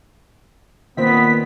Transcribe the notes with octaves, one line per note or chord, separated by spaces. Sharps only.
A#2 D#3 B3 C4 B6